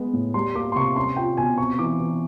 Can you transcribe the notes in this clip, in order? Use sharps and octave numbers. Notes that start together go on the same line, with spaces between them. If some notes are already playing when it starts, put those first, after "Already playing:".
Already playing: G#3 B3
A2
G3 C6
A#3 D6
C6
C3 C#6
C#4 C6
F4 G5
B2 G#5
C4 C#6
E3 D6
E3